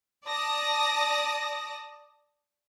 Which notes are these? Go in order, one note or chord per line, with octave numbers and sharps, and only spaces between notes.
D5 A5 D#6 A#6